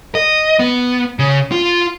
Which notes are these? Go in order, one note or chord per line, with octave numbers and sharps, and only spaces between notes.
D#5
B3
C#3
F4